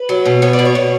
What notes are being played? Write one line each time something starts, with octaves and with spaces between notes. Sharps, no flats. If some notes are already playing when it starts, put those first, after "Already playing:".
Already playing: B4
F#3
B2
B3 C#5
D5
B2
C#5
B2